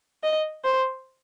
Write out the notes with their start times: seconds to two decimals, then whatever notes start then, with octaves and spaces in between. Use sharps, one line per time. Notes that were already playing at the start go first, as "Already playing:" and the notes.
0.23 D#5
0.64 C5